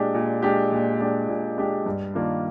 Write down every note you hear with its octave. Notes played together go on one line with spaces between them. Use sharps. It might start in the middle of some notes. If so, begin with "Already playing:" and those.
Already playing: A#2 G#3 D4 G4
A#2
G#3 D4 G4
A#2
G#3 D4 G4
A#2
G#3 D4 G4
G2
D#3 A#3 D4 F4